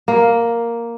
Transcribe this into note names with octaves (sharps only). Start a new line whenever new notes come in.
A#3